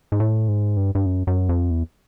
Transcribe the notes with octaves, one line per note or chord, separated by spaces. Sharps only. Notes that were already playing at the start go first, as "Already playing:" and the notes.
G#2
A2
G#2
G2
G2
F#2
F#2
F2
E2